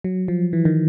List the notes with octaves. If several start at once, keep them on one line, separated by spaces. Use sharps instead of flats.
F#3
F3
E3
D#3